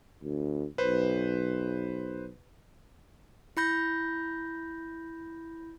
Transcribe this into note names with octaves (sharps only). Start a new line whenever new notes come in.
D2
B1 B4 C5
E4 B5 G6 A#6